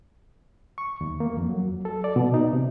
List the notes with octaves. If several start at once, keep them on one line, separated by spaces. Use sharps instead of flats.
C#6
D#2
A#3
F2
F#3
A4
D5
B2
D#4
C3